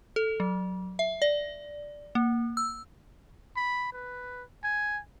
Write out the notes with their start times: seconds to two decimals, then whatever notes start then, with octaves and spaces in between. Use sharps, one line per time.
0.16 A4
0.40 F#3
0.99 E5
1.22 D5
2.15 A#3
2.57 E6
3.57 B5
3.93 B4
4.64 G#5